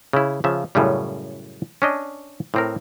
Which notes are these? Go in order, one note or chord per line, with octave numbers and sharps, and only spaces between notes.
C#3 E4
C#3 F3 E5
F#2 A2 C#3 G3
C#4 D4 D#5
A2 C4 A#4